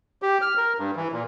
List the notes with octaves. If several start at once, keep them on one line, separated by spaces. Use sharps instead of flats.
G4
F6
A#4
G2
E3
A#2